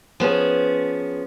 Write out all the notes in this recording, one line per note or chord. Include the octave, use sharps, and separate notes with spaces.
F3 B3 C#4 G#4